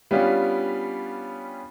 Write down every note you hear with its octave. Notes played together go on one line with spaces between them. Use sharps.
G3 B3 C#4 D4 F4 G4